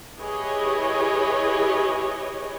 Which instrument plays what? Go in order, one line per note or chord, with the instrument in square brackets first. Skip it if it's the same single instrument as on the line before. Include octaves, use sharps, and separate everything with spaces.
[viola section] E4 G4 G#4 B4 C#5 D#5